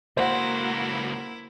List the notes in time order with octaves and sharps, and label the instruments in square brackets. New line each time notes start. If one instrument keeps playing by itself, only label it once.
[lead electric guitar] C#2 F#4 [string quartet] A#3 [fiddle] E4 [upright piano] C5 F#5